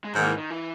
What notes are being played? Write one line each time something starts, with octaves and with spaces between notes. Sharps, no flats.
G#3
G#2 D#3 F#3 A#3
E3
D#3
E3